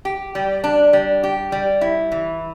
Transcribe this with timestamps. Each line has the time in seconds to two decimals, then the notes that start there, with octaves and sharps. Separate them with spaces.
0.05 G4
0.35 G3
0.64 D4
0.93 G3
1.23 G4
1.52 G3
1.81 E4
2.12 E3